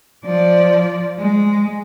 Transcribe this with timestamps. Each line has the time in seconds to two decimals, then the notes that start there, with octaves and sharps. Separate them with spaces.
0.25 F3 D5
1.18 G#3